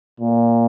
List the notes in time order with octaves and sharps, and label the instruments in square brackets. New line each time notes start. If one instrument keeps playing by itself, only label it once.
[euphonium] A#2